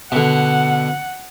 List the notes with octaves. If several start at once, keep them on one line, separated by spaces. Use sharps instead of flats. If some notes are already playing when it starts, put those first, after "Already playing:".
B2 D3 F#5